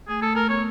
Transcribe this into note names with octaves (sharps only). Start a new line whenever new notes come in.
A3 G#4
A3 A4
A3 A#4
B3 C#5